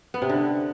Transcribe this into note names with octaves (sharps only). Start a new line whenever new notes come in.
B3
C3
D3